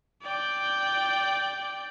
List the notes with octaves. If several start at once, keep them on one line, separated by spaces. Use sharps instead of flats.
D5 G5